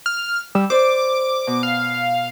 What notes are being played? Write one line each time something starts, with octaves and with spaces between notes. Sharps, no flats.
F6
G3 E6
C5 D5 D6
B2
F5